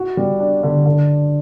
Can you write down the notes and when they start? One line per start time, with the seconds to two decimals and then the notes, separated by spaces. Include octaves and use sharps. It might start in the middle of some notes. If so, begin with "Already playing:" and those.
Already playing: F#4
0.17 G3
0.40 D4
0.63 D3
0.86 D3